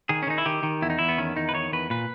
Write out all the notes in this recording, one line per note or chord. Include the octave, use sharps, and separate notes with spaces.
D#3 G#4
C#4
D#3 D#4
E4
D#3 G4
D#3
E2 E4
D#4
E2 E4
B3
D#3 C#4
E2 D#4
B4
D#3 C#5
E2 B4
A#2 B4